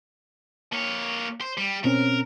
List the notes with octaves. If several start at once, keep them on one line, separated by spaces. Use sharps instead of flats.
A#3 C#5
C5
G3
B2 C4 C#4 A#4